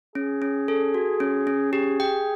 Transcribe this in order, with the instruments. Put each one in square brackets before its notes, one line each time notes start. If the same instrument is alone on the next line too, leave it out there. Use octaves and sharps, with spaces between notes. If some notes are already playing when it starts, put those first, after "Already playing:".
[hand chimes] C#4 [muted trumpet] G#4
[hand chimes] C#4
A4
F#4
C#4
C#4
[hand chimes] G4 [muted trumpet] G#4
[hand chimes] G5